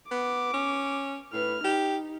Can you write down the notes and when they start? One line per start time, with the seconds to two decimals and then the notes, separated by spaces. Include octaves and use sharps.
0.11 B3 D6
0.54 C#4
1.33 A2 B4 F6
1.64 D#4 G4